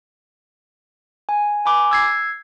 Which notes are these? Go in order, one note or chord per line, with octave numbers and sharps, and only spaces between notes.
G#5
G#5 B5 D6
E6 G#6 C7